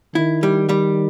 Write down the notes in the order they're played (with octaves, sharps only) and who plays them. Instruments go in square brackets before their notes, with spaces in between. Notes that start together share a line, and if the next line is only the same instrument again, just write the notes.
[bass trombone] D#3 [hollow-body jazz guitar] E4
[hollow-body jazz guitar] G3
G3